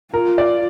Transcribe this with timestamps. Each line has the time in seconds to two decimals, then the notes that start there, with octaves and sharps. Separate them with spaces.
0.14 F4 A#4
0.38 D5